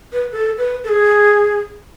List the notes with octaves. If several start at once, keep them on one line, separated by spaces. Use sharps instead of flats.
B4
A4
B4
A4
G#4